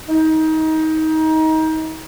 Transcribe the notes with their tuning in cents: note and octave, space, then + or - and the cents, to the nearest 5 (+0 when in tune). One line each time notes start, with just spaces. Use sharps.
D#4 +25